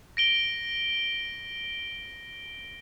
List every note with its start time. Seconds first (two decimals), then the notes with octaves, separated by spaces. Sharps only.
0.17 A#6 D7 G7